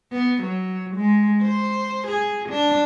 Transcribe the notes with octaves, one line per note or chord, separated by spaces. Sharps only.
B3
F#3
G#3
C5
G#4
D4